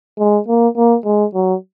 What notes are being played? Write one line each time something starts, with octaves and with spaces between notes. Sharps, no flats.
G#3
A#3
A#3
G#3
F#3